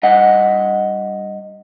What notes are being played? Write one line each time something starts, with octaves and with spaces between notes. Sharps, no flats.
G2 D#5 F#5